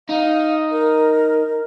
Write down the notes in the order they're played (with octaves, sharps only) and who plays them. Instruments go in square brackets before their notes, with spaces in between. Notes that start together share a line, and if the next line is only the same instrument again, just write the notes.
[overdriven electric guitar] D#4 [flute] F5
[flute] A#4